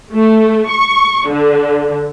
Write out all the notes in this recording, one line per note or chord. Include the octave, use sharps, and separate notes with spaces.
A3
C#6
D3